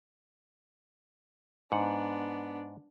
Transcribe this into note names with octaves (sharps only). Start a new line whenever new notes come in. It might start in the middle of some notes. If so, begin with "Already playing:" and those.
G#2 B3 D4 F#5